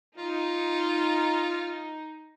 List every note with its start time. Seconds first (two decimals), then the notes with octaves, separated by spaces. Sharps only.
0.17 D#4 F4